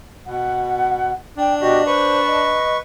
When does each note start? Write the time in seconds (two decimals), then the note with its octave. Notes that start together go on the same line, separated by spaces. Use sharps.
0.26 B2 F#5
1.38 D4 G5
1.61 B2 F#4 G4 D#5
1.86 B4 C5 C#6
2.27 D#5